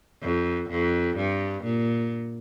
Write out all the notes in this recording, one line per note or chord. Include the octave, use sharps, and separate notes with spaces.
F2
F2
G2
A#2